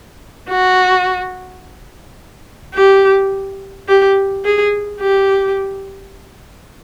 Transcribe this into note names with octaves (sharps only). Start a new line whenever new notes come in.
F#4
G4
G4
G#4
G4